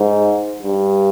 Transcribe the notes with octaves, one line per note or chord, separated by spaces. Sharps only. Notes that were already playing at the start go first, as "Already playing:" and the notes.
Already playing: G#2
G2